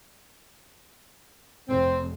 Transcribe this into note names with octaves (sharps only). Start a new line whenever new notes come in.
F1 C4